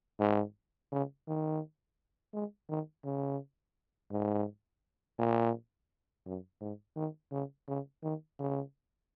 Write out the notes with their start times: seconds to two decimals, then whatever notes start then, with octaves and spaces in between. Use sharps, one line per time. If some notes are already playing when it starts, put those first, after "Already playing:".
0.20 G#2
0.92 C#3
1.27 D#3
2.33 G#3
2.69 D#3
3.05 C#3
4.12 G#2
5.18 A#2
6.26 F#2
6.61 G#2
6.96 D#3
7.32 C#3
7.68 C#3
8.03 D#3
8.39 C#3